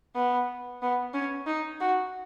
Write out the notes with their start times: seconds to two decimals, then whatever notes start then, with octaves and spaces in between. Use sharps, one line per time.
0.15 B3
0.82 B3
1.14 C#4
1.47 D#4
1.80 F#4